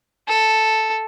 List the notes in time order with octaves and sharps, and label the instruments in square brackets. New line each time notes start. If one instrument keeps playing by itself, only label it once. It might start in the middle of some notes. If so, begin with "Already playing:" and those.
[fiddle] A4